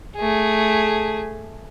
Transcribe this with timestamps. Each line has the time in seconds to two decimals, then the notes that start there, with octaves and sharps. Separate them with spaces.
0.16 A3 G#4